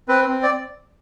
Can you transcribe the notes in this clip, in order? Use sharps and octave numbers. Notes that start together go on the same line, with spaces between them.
C4 B4
C4
D5